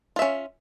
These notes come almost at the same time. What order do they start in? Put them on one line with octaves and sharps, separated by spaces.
F4 E5 C#4